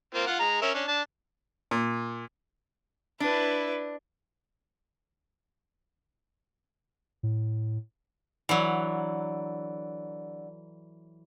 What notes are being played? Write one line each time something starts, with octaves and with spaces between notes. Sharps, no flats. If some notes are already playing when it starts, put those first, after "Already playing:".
A#3 C4 F4
F4 F#5
G#3 A#5
C#4 A#4 E5
C#4 D4
D4 A5
A#2
D4 E4 B4
A2
D3 E3 F#3